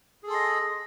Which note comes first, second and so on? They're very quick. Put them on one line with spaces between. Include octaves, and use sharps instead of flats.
G#4 A4 C6 D#5